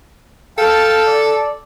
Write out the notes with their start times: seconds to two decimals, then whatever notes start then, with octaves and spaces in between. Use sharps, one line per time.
0.58 A4 F5 G5 A5
1.07 D5